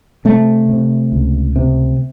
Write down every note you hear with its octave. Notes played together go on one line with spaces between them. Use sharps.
C3 A3
C3
C#2
C3